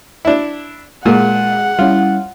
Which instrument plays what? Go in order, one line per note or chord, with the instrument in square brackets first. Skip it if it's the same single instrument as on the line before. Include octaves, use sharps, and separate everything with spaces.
[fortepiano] D4 E4
[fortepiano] A#2 [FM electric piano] G#3 G#4 [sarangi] F#5
[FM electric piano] G3 C#4 E4 [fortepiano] F4